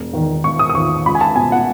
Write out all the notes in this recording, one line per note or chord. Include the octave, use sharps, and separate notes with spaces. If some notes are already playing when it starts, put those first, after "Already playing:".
Already playing: E1
E2 D#3
E1 C#6
D#6
D#6
E2 D#3 C#6
C#2 B5
G#5
A5
B2 G#5
F#5